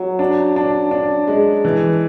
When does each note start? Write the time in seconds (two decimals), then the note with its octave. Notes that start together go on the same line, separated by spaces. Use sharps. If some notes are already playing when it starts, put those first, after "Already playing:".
Already playing: F#3
0.19 D4
0.56 D4
0.91 D4
1.28 G#3
1.65 E3